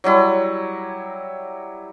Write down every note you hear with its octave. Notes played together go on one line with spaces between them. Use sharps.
F#3 G3 E4